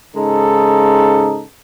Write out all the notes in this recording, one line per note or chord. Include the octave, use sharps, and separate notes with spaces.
G#2 C#3 G#3 D#4 A4